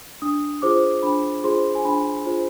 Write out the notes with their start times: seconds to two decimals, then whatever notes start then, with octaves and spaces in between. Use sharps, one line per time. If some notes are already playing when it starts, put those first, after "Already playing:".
0.22 D4 D#6
0.62 F4 G#4 C5 D6
1.02 D4 B5
1.44 F4 G#4 C5 C6
1.75 G#5
1.85 D4 B5
2.26 F4 G#4 C5